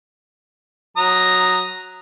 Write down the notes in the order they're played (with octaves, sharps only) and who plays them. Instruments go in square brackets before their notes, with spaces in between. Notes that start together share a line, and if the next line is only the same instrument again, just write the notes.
[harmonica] F#3 A#5 D#6